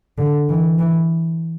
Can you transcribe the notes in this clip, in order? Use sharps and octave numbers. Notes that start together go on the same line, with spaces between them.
D3
E3
E3